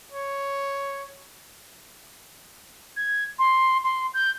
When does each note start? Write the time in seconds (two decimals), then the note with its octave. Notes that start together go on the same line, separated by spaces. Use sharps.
0.12 C#5
2.96 G#6
3.39 C6
3.83 C6
4.14 G6